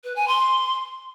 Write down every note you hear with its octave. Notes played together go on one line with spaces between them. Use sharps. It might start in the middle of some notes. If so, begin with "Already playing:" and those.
B4
G#5
C6